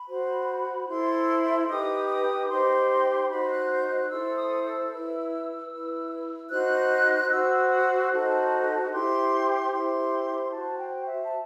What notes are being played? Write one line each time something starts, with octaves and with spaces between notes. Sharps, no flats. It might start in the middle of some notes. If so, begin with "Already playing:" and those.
Already playing: B5
F#4 C5
E4 A4 C5 C6
D#4 G4 B4 D#6
D#6
D#4 G4 C5 C6
D#4 F#4 C5 B5
F#6
G6
F#6
E4 A4 C5 E6
D#6
E6
E4 B4
E4 B4
D#4 F#4 C5 F#6
F#4 C5 E6
D#4 F#4 A4 C5
E4 G4 C5 C6
E4 G4 C5 C6
F#4 C5 A5
G5
E5
A5